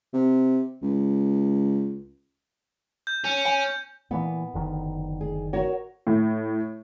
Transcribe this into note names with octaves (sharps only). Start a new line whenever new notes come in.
C3
C#2
G6
C#4
G#5
A#2 E3 B3
F#1 D3 D#3
G#4
F#4 A#4 C#5
A2